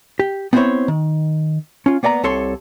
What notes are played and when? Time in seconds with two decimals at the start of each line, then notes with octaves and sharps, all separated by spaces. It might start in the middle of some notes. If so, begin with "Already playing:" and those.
0.19 G4
0.53 B3 C4 E4 G#4 C5 C#5
0.88 D#3
1.86 C#4 F4
2.03 A#3 B3 D5 F5 A#5
2.24 C2 C3 A4 C#5 C6